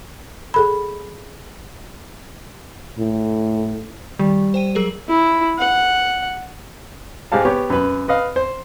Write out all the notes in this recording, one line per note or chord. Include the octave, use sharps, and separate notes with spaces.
G#4 A4 B5
A2
D#3 G3
C5 G5 D#7
F#3 G#4 A#4
E4
F#5
G#2 G#3 G4 F5 A5
B3 G4 C#5
F#2 B4
B4 D#5 F5
C5